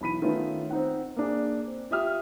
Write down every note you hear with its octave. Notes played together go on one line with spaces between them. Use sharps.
B1 E3 B5 B6 D#7
D#3 A3 B3 C#4 F4
C4 D#4 F#5
A#3 D4 G#4
C4
F4 G4 E5 D#6 F6